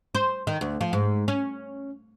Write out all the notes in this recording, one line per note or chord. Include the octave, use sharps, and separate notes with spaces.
C5
D#3
D2
F3
G#2
C#4